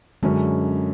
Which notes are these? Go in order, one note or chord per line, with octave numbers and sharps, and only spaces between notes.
F#2 D3 F#3 G#3 C#4